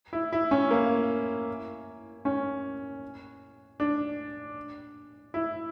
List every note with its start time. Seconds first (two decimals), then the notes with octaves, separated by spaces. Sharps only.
0.13 E4
0.33 E4
0.51 C#4
0.71 A#3
2.25 C#4
3.80 D4
5.34 E4